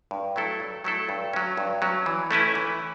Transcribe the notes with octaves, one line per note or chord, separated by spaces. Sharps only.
G2
F#3 A3 E4 A4
G2
F#3 A3 E4 A4
G2
F#3 C#4
G2
F#3 C#4
E3
A3 C#4 E4 B4
E3